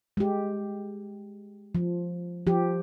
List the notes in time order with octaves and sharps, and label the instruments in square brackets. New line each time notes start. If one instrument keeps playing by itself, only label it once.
[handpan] G#3 G4
F3
F3 G4